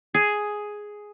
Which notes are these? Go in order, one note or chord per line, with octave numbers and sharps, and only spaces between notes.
G#4